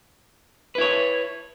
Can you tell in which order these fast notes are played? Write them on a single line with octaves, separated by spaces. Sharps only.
B4 E4 C#5